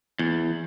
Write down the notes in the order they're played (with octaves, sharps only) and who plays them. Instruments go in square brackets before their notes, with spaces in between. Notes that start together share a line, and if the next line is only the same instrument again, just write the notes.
[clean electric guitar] E2